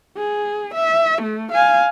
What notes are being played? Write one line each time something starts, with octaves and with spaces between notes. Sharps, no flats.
G#4
E5
A3
F5 G#5